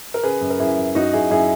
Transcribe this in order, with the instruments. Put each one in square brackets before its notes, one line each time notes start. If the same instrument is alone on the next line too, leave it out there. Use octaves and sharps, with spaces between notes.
[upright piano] A#4
C#3 G#4 B4
F#2
A#4
F#2 E4 G#4
F#2
F#2 D#4 F#4
F#2 E4 G#4
F#2 E4 G#4